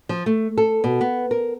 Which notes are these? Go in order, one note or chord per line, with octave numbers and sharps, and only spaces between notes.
F3
A3
A4
B2
B3
A#4